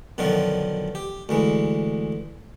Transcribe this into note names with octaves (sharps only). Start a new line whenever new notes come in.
F#2 B2 D3 D#3 F3 F4
G4
D2 E3 G#3